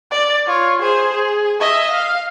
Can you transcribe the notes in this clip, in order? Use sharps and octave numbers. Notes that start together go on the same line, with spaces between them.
D5
F4 C#5
G#4 C5
G#4
D#5 E5
F5